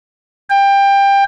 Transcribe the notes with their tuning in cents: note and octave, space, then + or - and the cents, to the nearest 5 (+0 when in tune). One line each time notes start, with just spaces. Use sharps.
G5 +20